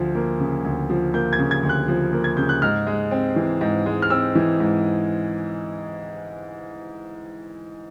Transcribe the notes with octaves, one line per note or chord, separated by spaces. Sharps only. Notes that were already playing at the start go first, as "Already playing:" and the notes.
Already playing: D2 F3
A#3
C#3
D2
F3
A#3 G6
G#6
C#3
G#6
D2
F#6
F3
A#3
G#6
C#3 G6
F#6
G#2 F6
G#3
C4
E3
G#2
G#3
F6
C4 E6
E3
G#2